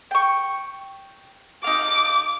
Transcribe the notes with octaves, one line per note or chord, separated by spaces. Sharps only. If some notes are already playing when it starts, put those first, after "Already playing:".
G5 C#6
D#4 F5 D6